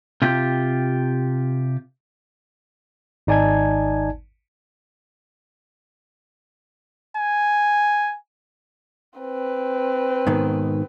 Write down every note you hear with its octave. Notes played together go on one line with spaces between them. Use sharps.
C3 F4 G4
G#1 D#4 D5 G#5 A5 G#6
G#5
C4 B4
G#2 B2 D#3